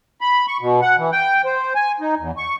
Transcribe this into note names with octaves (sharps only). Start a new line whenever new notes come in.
B5
C#6
B2
F#5
E3
G5
C5
G#5
D#4
E2
C#6